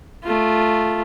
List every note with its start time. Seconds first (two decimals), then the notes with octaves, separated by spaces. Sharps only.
0.23 A3 F4